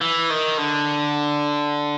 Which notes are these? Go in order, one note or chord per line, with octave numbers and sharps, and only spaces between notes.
E3
D#3
D3